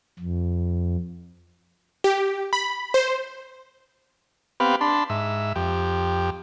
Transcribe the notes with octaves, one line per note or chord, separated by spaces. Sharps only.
F2
G4
B5
C5
B3 C4 G4 B4 F5
D4 A5 B5 C6
G#2 E5
F2 G4